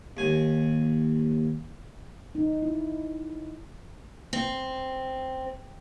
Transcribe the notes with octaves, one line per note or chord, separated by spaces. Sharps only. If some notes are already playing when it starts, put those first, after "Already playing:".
D#2 G#5
D#4
E4
C4